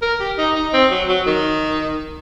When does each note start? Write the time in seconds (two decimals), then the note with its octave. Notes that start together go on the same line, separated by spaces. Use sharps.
0.02 A#4
0.20 G4
0.38 D#4
0.55 D#4
0.73 C4
0.91 F#3
1.08 F#3
1.26 D#3